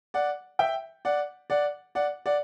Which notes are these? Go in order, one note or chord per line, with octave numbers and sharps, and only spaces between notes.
D5 F#5
E5 G5
D5 F#5
D5 F#5
D5 F#5
D5 F#5